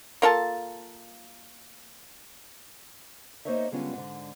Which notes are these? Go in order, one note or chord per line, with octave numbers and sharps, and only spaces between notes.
A#3 F4 A4 A5
A#3 D#4 C5 C#5 D#5 E5
D3 G3 G#3 B3 C#4 F4
G#2 D3